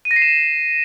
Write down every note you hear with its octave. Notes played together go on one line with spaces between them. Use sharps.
D#7
A#6
C7
E7